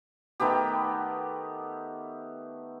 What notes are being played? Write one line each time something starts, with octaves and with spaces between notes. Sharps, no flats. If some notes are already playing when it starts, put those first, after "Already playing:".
D#3 A3 B3 G4